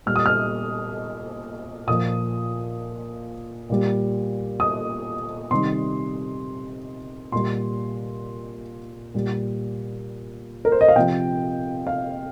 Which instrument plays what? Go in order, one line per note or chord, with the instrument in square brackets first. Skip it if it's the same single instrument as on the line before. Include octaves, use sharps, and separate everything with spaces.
[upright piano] A#2 G3 F6
D#6
F6
A#2 F3 D#6
A#2 G3
D#6
C3 D#3 G3 C6
A#2 G3 C6
A#2 G3
A#4
C5
D#5
F5
C3 F3 G5
F5